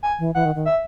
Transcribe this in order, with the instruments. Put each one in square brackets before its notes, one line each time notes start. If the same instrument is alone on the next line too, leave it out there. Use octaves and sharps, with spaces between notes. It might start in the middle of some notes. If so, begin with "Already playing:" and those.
[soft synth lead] G#5
[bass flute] E3
[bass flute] E3 [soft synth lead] F#5
[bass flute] D#3
D#3
[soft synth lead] E5